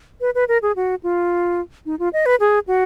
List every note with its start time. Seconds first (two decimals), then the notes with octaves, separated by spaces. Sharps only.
0.21 B4
0.35 B4
0.48 A#4
0.62 G#4
0.76 F#4
1.03 F4
1.86 D#4
1.99 F4
2.13 D#5
2.26 B4
2.40 G#4
2.68 F#4